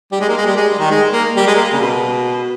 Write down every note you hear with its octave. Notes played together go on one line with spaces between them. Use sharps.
G3
G#3
A#3
G#3
G3
G#3
G3
D#3
G#3
A#3
G3
G#3
A#3
C#3
B2